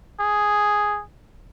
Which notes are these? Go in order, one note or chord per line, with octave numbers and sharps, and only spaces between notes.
G#4